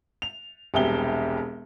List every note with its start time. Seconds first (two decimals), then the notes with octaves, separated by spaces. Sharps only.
0.22 F7
0.74 E1 C2 G4 G#4 G7